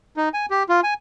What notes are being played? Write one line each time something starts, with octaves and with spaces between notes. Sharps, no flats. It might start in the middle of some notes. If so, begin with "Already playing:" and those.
D#4
G#5
G4
F4
G#5